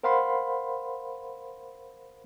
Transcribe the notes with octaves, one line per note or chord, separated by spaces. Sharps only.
A#4 C5 F5 F#5 B5 C6